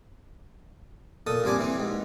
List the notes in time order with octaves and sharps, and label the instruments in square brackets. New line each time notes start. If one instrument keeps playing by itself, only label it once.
[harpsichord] A#2 A4 D#6
A#1 G3 C4 G#5 D6
E3 C4
G#2